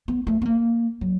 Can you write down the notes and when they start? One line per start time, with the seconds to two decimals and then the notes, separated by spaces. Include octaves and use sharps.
0.08 B3
0.27 A3
0.42 B3
0.46 A#3
1.01 F#3